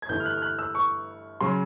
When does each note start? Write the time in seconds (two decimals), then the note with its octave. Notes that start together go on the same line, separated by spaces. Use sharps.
0.02 G#6
0.09 G1 G2 E3 A3 G6
0.20 F6
0.25 F#6
0.37 F6
0.42 F#6
0.59 E6
0.75 C#6
1.41 C#3 F#3 C6